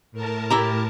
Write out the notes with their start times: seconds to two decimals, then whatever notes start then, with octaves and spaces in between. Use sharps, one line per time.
0.12 A2 A#4 A5
0.50 E4 G4 A#5